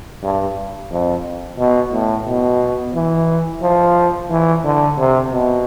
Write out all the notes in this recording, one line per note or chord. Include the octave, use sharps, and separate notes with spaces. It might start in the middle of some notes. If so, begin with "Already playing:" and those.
G2
F2
B2
A2
B2
E3
F3
E3
D3
C3
B2